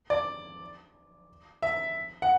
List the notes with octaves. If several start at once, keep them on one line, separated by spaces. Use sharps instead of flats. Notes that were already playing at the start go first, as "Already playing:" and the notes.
D5
E5
F#5